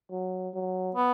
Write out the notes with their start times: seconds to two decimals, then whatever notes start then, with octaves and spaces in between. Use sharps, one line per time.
0.11 F#3
0.54 F#3
0.95 B3